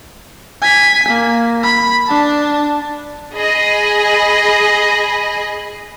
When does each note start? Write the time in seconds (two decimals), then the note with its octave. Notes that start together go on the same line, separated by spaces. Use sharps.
0.62 G#5 B6
1.09 A#3
1.63 B5
2.07 D4 A5
3.33 G#4 D#5 B5